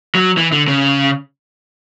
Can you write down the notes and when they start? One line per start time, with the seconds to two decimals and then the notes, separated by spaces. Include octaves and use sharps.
0.15 F#3
0.38 E3
0.52 D3
0.68 C#3